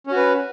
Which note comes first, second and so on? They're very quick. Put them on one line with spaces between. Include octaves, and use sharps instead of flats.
C#4 F#4 B4